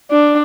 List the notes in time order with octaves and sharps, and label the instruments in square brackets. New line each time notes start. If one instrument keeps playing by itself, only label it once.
[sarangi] D4